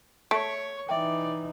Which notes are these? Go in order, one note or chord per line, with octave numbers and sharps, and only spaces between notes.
A3 C#5 C#6 B6 D7
E3 D#4 D5 E5 G5